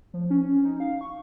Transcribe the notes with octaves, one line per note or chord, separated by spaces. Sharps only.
F3
C#4
D#4
F5
C#6